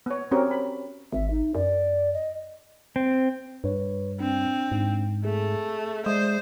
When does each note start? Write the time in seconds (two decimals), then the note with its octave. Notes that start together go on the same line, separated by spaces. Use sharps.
0.06 B3 C#5
0.31 C4 C#4 F#4 G4 A#4 C#5
0.51 B5
1.13 G#1 E5
1.31 D#4
1.55 F#2 D5
2.14 D#5
2.96 C4
3.64 G2 B4 C#5
4.20 C4 D4
4.72 G#2
5.25 A3 G#4
6.06 G#3 C5 D5 E5 D#6